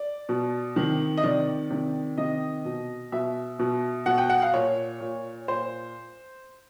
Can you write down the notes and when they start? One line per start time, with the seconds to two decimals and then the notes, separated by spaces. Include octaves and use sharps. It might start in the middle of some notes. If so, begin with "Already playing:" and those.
Already playing: D5
0.29 B2
0.76 C3 D#3
1.17 D#5
1.23 C3 D#3 D5
1.70 C3 D#3
2.17 C3 D#3 D#5
2.65 B2
3.12 B2 E5
3.59 B2
4.06 B2 F#5
4.18 G5
4.30 F#5
4.42 F5
4.54 A#2 C#5
5.01 A#2
5.48 A#2 C5